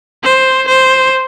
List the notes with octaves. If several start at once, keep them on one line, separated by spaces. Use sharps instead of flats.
C5
C5